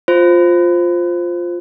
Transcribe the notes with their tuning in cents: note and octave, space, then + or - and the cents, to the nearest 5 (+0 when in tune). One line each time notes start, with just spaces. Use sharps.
F4 +5 C5 +0